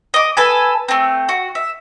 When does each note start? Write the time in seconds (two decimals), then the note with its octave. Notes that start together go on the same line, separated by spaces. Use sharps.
0.14 D#5 D6
0.37 A4 B4 G#5
0.89 A3 C4
1.29 F#4
1.55 E5